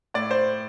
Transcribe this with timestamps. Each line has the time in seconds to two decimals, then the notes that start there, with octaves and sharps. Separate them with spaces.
0.14 A2 D5
0.31 C5